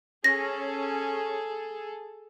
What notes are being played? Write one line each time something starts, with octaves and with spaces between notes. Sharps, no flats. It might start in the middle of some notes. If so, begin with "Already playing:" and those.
C#4 G#4 A4 A#6